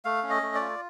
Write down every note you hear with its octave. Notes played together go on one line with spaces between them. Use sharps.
A3 F5
C#4
D#5
A3
D5
F4